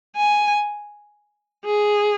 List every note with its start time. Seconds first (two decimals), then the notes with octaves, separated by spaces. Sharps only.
0.16 G#5
1.65 G#4